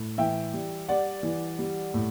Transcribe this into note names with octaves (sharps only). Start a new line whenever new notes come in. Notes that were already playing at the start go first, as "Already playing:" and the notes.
Already playing: A2
E3 E5 G5
G3
G3 D5 F#5
E3
G3
A2